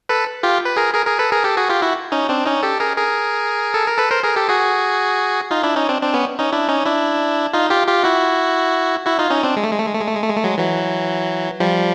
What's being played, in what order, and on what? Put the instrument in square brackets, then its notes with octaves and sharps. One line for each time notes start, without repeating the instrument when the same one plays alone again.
[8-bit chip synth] A4 B4
F4 G4
B4
G#4 A#4
G#4 A#4
G#4 A#4
A4 B4
G#4 A#4
G4 A4
F#4 G#4
F4 G4
E4 F#4
C#4 D#4
C4 D4
C#4 D#4
G4 A4
G#4 A#4
G#4 A#4
A4
A#4
A4 B4
A#4 C5
G#4 A#4
G4 A4
F#4 G#4
D#4 F4
D4 E4
C#4 D#4
C4 D4
C4 D4
B3 C#4
C#4 D#4
D4 E4
C#4 D#4
D4 E4
D#4 F4
F4 G4
F4 G4
E4 F#4
E4 F#4
D#4 F4
C#4 D#4
C4 D4
G#3
A3
G#3
A3
G#3
A3
G#3
A3
G#3
A3
G#3
A3
F#3 G#3
E3 F#3
F3 G3